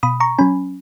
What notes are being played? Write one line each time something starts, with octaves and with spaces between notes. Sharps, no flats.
B2 B5 D#6
A#5 C#6
F#3 C#4 G#5 B5